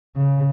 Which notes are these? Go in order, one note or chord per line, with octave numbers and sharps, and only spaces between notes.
C#3